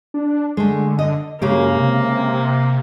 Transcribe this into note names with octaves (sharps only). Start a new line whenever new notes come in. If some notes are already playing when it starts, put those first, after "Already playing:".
D4
D3 G#3 A3
D#5
F#2 C#3 G#3 A#3 G4
C3